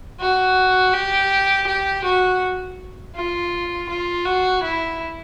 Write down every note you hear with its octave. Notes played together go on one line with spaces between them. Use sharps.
F#4
G4
G4
F#4
F4
F4
F#4
E4